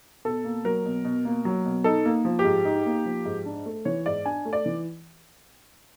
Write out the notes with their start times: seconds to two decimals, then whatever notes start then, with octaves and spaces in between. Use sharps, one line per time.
0.25 B2 A4
0.44 A#3
0.65 F#3 A#4
0.85 B2
1.04 B2
1.25 A#3
1.45 F#3
1.65 B2
1.84 D#4 A4
2.05 A#3
2.25 F3
2.39 G4
2.45 G#2
2.65 D#4
2.86 A#3
3.06 F3
3.25 G#2
3.46 D4
3.66 A3
3.85 E3 C#5
4.06 G#2 D5
4.26 D4 G#5
4.45 A3
4.53 D5
4.66 E3